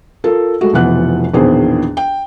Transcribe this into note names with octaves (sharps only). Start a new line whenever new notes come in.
F4 A4 A#4
G#3 A3 F#4
F1 B2 E3 F3 F#5 F#6
A#1 E2 B2 D#3 G#4 C5
G5